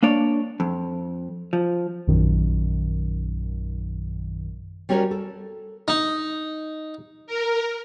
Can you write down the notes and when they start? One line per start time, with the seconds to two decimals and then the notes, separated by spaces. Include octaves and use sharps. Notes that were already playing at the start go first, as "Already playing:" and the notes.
0.03 A#3 D4 C#5 D5
0.60 F2
1.53 F3
2.07 A#1 F#2 D#3
4.89 G3 C#4 F#4 G#4 A#4 C#5
5.11 A4
5.88 D#4
7.27 A#4